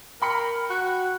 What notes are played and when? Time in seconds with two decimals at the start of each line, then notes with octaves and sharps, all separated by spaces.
0.22 A#4 G5 B5 C#7
0.70 F#4 F#6